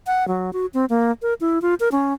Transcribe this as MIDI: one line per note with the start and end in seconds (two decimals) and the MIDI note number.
0.07 0.27 78
0.28 0.53 54
0.53 0.66 66
0.74 0.85 60
0.90 1.11 58
1.22 1.34 70
1.41 1.62 64
1.62 1.75 65
1.80 1.89 70
1.92 2.13 61